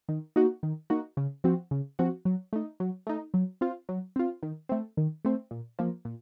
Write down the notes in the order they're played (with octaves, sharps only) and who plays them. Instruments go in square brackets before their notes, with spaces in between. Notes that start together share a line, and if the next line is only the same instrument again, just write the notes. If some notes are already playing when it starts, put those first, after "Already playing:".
[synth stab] D#3
A#3 D#4 F#4
D#3
A#3 D#4 F#4
C#3
F3 C4 F#4
C#3
F3 C4 F#4
F#3
A3 D#4
F#3
A3 D#4
F#3
C4 F4
F#3
C4 F4
D#3
A3 C4
D#3
A3 C4
A#2
F3 A#3
A#2